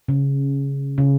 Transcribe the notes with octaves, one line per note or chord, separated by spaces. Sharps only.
C#3
C#3